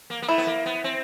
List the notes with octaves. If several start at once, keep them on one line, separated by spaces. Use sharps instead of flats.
A#3
A#3
A3 E4
B3
A#3
B3
C4